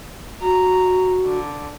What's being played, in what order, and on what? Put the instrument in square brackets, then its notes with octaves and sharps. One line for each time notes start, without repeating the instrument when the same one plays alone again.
[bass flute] F#4 [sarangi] A#5
[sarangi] D3